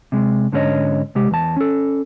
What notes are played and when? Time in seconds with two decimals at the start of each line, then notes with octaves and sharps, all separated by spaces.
0.12 C3 G#3
0.52 G#2 D3 C#4 D#4 C#5 D#5
1.15 C3 G#3 G4
1.31 E2 A5
1.56 C#4 A4